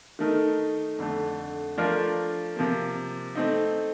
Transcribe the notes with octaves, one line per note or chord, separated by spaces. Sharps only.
D#3 A3 D#4 A#4
F2 D3 A3
F3 A3 D4 F4 A#4
C3 F3 A#3
A3 C4 D#4